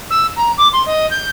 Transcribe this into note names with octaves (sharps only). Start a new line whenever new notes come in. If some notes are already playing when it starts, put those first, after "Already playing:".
E6
A#5
D6
C6
D#5
G6